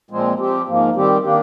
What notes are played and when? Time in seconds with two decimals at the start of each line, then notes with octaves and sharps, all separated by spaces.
0.11 A#2 F3 G#3 C4
0.39 F3 C4 G4
0.67 G#2 F3 A#3
0.95 D#3 G3 C4 G4
1.24 D#3 A#3 D4 G4